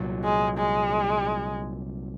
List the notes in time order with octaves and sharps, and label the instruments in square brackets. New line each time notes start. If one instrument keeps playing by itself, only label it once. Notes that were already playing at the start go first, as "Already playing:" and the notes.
Already playing: [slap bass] C2 A#2 F#3
[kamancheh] G#3
G#3